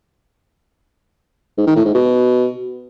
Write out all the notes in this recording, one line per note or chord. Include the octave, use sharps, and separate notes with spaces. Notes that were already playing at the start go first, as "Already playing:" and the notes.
G#2
D#3
A2
G#2
B2